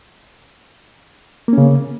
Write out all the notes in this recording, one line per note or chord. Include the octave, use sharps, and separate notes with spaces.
C#3 A#3 C#4